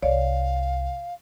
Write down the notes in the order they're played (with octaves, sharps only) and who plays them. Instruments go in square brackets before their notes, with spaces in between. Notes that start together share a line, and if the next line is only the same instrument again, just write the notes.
[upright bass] C2 [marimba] C#5 D5 [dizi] F5